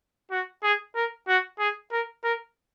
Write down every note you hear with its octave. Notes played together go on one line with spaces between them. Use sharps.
F#4
G#4
A#4
F#4
G#4
A#4
A#4